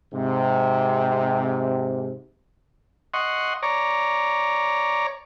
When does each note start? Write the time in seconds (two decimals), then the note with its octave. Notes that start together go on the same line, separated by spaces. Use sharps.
0.14 G#2 C3
3.14 D#5 F#5 C6 C#6
3.63 C#5 D5 A#5